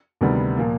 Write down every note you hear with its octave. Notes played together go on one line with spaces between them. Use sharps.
D2 C3 D#3 G3 B3
A#2 F3 A#3